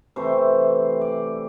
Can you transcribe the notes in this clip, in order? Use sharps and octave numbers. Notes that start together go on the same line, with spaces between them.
C3 E3 A3 C5
D5